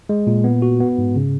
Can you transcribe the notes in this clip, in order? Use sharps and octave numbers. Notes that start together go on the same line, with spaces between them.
G#3
A#2
B3
F#4
B3
G#2
C#3